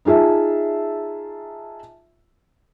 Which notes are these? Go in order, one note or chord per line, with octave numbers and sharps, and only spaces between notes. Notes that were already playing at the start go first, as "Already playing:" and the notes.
D#4 F4 G#4 E5 A5